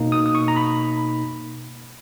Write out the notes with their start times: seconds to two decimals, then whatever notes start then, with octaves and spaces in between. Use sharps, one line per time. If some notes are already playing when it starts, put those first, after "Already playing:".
Already playing: B2 A#3 D#4
0.12 D#6
0.26 D#6
0.35 C#6
0.48 A#5
0.56 B5